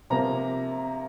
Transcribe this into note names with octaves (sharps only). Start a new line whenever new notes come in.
C3 F3 A#3 A#5